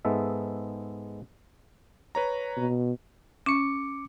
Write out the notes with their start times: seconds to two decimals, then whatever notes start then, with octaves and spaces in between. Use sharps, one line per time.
0.05 G#2 G#3 B3 A4 E5
2.15 B4 C#5 A#5
2.57 B2
3.46 C#4 D6 C#7